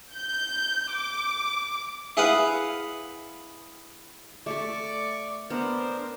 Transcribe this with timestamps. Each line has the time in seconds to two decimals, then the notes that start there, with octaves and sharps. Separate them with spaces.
0.15 G6
0.94 D6
2.17 E4 G#4 B4 F5 F#5
4.46 A3 A4 D5 C#6 D6
5.50 B3 D4 A#4 C5